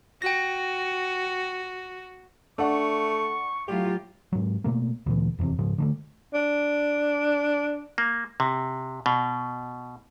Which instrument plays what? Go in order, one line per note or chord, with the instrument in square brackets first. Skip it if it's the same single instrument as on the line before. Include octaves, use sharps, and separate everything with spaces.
[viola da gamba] F#4 [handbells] G5 A#6
[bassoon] A3 [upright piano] D4 F#5 [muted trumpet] C#6
[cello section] A2 F#3 F4 [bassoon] G4
[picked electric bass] G#2 F#3
B2 A3 A#3
D2 A#2 E3
F1 E2 A2 C3
G#2 C#3 F3
D3 F3 A3
[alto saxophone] D4
[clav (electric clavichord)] A#3
C3
B2